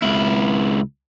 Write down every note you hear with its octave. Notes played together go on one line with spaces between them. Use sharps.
C#2 E4